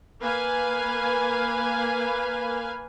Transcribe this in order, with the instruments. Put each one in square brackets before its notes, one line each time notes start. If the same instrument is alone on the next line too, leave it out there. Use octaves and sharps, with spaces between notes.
[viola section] A#3 B4 F5 G#5